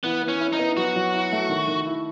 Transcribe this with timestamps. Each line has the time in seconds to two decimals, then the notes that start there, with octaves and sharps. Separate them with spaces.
0.04 E3 B3
0.22 E3
0.28 C#4
0.40 E4
0.53 D#4
0.59 B3
0.77 F#3 F#4
0.96 F#3
1.13 E4
1.32 A3
1.50 D#3
1.68 D#3
1.86 E4